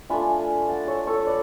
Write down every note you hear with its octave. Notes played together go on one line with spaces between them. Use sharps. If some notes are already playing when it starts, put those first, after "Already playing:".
A3 D4 F4 G#5 B5
F#5 A5
A4 C#5
A4 C#5
B4 D5